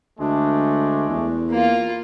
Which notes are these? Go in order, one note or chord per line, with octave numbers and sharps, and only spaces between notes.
D2 G#3 A3 D4
E2
A#3 F4